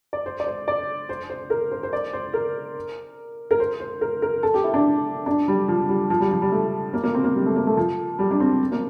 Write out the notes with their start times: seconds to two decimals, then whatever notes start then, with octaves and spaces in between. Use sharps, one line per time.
0.13 D5
0.26 C5
0.40 D5
0.47 C5
0.68 D5
1.09 C5
1.30 C5
1.50 A#4
1.71 C5
1.83 C5
1.93 D5
2.13 C5
2.34 A#4
3.51 A#4
3.60 C5
3.80 C5
4.01 A#4
4.22 A#4
4.43 A4
4.54 G4
4.64 E4
4.74 D4
5.26 D4
5.48 G3
5.68 F3
5.89 G3
6.10 F3
6.20 G3
6.31 F3
6.42 G3
6.52 A3
6.93 A#3
7.04 A#3
7.15 C4
7.24 A#3
7.36 G3
7.46 A3
7.56 A#3
7.67 A3
7.77 F3
8.19 G3
8.31 D4
8.40 C4
8.72 A#3